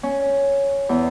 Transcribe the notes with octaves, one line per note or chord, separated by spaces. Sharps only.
C#4
E2